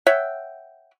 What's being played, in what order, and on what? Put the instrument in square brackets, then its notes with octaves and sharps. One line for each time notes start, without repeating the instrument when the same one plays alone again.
[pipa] C#5 E5 F#5 G5